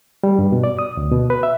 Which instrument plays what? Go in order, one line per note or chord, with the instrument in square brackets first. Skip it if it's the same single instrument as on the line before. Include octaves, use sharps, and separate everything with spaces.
[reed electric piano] G3
G2
B2
D5
D#6
D2
B2
B4
E5